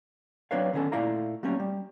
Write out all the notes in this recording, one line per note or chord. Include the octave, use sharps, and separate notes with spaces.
F#3 C4 D4 B4 C#5 F5
D3 D#3 B3 C#4 G4 A4
A#2 A3 E4 D5 F5 A#5
F#3 G3 A3 A#3 C4 C#4
G3